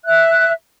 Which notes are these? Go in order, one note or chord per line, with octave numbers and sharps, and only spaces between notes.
E5 F#6